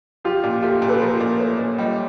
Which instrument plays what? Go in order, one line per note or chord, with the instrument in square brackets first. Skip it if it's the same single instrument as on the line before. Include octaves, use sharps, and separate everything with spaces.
[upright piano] F3 [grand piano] F4 G4
[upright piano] A#2
[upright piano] A3 [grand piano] F4 G4
[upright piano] A#2
[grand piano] A4 B4
[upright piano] F3 [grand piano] A#4 C5
[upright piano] A#2
[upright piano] A3 [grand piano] B4 C#5
[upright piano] A#2
[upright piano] G3 [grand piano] C#5 D#5